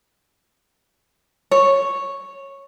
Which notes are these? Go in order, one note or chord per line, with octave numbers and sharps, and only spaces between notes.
C#5